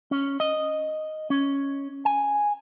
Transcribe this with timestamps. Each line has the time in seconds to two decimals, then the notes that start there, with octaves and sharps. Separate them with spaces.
0.11 C#4
0.40 D#5
1.30 C#4
2.05 G#5